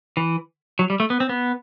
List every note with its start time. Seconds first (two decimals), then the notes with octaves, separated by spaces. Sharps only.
0.17 E3
0.79 F#3
0.90 G3
1.00 A3
1.10 B3
1.20 C4
1.29 B3